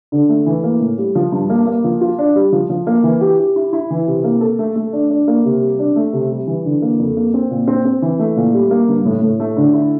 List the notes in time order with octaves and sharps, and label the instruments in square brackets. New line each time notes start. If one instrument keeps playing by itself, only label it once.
[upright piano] D3
A3
E3
A#3
A2
G3
F3
G2
A#3
A#3
F3
F4
D4
G3
F3
F3
A#3
E3
G4
G4
E4
E4
E3
C3
A#3
A4
A3
A3
D4
D4
A#3
C3
G3
D4
A3
C3
G3
E3
D3
A#3
F2
A#3
C4
A#2
C4
C4
E3
A3
A#2
G3
A#3
G2
A2
A2
A3
D3
E4